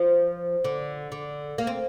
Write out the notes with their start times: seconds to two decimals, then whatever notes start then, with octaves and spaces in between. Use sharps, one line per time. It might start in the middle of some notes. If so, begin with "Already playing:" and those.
Already playing: F3
0.64 D3
1.12 D3
1.58 A#3
1.67 C4